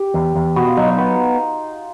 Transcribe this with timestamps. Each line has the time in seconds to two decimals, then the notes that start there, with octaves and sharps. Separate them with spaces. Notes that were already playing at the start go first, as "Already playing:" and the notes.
Already playing: G4
0.14 E2
0.36 E2
0.56 B2 F#4
0.67 F4
0.77 F#3 D#4
0.88 D#4
0.98 B3